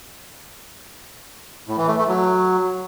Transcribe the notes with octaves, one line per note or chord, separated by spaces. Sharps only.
A2
E3
A3
A3
F#3